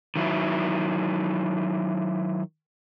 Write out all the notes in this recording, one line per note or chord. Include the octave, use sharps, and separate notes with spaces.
D#3 F#3 E4